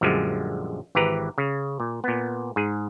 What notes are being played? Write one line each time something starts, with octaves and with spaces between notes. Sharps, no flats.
A#1 F#2 D3 F3 G3 G#3
G#1 E3 G4 B4 A#5
C#3
A#2
A#2 B3
G#2 G#4